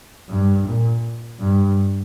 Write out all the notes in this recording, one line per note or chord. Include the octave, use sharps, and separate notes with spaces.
G2
A#2
G2